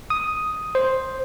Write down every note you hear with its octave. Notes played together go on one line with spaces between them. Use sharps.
D#6
C5